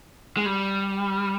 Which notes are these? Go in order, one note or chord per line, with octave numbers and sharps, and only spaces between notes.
G#3
G3